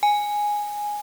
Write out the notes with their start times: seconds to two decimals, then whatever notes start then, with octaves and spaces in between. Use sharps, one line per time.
0.03 G#5